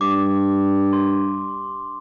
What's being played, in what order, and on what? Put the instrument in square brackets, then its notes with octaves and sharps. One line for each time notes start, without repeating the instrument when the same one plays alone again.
[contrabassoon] G2 [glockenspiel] D6
[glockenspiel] C6